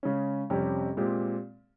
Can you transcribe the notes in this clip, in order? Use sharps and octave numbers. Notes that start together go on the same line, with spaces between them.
C#3 G#3 C#4
F2 C3 G3 C#4 G4
A#2 G#3 C4 G4